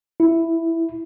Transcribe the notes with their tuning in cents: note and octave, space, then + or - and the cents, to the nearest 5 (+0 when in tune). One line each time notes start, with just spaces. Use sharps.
E4 +0